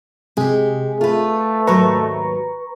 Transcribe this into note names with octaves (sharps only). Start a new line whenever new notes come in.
C3 G#3 G4 G#4
A3 F4 B4
D#2 G#2 F#3 B4 A#5 C#6